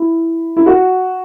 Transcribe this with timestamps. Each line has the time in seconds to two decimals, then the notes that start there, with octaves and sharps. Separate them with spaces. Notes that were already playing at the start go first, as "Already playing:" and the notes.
Already playing: E4
0.57 E4
0.66 F#4